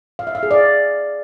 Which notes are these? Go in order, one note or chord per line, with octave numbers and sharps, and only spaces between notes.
F5
E5
F5
G#4
D5